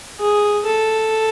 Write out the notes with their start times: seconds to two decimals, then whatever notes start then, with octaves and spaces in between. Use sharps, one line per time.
0.19 G#4
0.66 A4